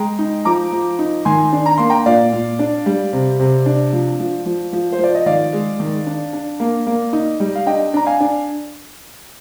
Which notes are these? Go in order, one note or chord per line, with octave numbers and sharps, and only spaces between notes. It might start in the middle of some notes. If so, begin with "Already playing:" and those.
Already playing: G#3 G5 A#5
D#4
F3 A#5 D6
F3
D#4
D#3 G#5 C6
D4
A#5
A#3 C6
G5 A#5
A#2 D5 F5
A#2
D4
G3
C3
C3
D4
F3
F3
F3
F3
C5
F3 D5
D#5
D#3 D5 F5
G#3
D#3
D4
D4
A#3
A#3
D#4
G3
F5
D4 D#5 G5
D4 A#5
F5 G#5
D4